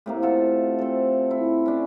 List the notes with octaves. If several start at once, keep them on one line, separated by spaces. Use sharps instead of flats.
A2 C3 A#3
F4 A4 F#5
C4 A4
E4
C#4 D4